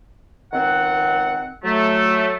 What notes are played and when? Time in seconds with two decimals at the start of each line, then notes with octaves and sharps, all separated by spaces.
0.54 C#2 D#3 C4 F#5
1.64 F#3 A3